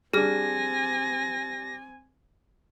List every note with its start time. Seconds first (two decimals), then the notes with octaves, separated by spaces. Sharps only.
0.14 G3 C4 D4 G#4 G#5 F6 A#6